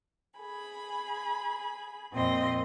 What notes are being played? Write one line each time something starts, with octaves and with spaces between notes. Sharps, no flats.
G#4 B5
F2 A#2 C4 D#5 C6